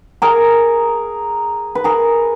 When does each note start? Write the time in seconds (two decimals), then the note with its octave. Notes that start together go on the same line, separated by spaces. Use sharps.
0.22 G#4 A#4
1.75 B4
1.84 G#4 A#4